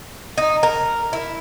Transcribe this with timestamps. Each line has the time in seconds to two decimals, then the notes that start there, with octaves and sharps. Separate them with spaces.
0.38 D#4
0.63 A#4
1.13 E4